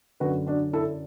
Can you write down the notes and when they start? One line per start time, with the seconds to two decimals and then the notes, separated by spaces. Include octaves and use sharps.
0.20 F#2 D3 F#4 B4
0.47 D4 F#4
0.73 E4 A4